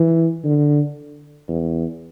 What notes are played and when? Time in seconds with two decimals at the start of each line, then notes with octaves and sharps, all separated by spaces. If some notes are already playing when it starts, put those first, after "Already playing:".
Already playing: E3
0.44 D3
1.49 E2